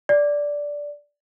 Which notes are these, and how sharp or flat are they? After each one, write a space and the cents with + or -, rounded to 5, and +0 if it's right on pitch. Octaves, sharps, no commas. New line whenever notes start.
D5 -10